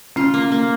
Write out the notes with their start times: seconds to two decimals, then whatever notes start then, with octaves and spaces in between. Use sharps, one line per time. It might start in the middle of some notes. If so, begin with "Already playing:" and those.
0.16 C#4 F4
0.34 A#3
0.52 A#3